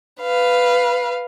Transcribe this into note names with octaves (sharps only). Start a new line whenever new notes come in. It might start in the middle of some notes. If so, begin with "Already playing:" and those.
B4 F5